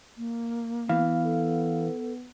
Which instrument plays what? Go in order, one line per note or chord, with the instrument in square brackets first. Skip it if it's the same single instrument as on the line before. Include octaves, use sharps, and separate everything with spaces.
[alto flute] A#3
[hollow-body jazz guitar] E3 [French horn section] B3 [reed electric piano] F5
[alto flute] A4